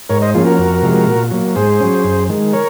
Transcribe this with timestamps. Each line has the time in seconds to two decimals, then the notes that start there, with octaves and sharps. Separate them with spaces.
0.09 G#2 A#4 C#5
0.22 C5 D#5
0.34 F3 A#3 C#4 F4 G#4
0.46 F#4 A#4
0.58 F2
0.82 C3 F3 G#3
1.07 A#2
1.31 F#3 A#3
1.56 G#2 G#4 C5
1.80 F#3 C#4
2.04 F#2
2.29 D#3 G#3
2.53 A#4 C#5